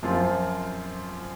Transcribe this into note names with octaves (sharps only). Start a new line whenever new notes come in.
F#2 F3 C4 F4